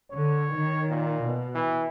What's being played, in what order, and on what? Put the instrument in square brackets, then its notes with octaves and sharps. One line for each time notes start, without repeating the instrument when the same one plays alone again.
[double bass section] D3 [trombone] C#5
[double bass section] D#3
[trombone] A#2
[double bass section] B2
[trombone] E3